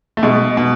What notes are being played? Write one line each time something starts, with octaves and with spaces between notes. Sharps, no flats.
A3
B2 G#3
B2